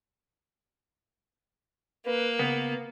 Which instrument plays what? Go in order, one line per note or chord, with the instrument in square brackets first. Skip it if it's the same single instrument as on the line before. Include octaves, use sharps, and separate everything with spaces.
[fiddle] A#3 [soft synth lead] B4
[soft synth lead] C#3 [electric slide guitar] B3